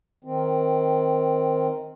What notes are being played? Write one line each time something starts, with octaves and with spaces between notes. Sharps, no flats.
D#3 C4